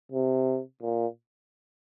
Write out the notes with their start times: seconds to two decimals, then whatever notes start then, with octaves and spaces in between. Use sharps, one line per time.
0.12 C3
0.82 A#2